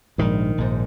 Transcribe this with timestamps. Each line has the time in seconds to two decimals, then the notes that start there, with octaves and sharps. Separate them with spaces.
0.18 A#1 G#2 D#3
0.58 A#1 G#2